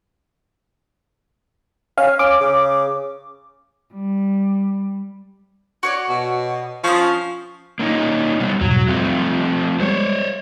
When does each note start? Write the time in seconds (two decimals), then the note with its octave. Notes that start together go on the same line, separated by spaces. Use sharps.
1.98 C#4 F5
2.19 C#4 D6
2.41 C#3
3.95 G3
5.83 F#4 C#5 D5
6.09 B2
6.84 F3 C#4 B5 D#6
7.79 A#3 C#4 D#4
8.40 C3 G3 B3
8.61 E2 G#2 B2 F#3
8.88 F3 G3 A3 C4
9.80 G3 G#3 B3 C5 C#5